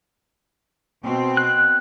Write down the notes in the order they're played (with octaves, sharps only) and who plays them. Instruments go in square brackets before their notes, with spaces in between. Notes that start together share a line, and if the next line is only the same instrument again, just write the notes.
[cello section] B2 C4
[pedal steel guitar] F#6